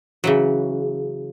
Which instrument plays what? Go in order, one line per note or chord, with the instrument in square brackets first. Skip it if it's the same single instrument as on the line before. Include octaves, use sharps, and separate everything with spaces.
[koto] C#3 E3 F#3